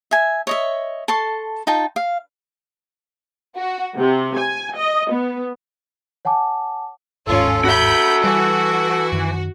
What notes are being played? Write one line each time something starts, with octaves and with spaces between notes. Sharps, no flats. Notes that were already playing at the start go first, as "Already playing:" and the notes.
E5 G#5
C#5 D#5 E5
A4 A5 C6 C#6
D#4 F4 G5 A5
F5
F#4
C3
G#5
D#5
B3
C#5 F#5 G#5 A5 D6
G1 D#2 G#2 C#4 F4 A4
F#4 E5 B5 G6
E3 G3 F#4
F#2 D#3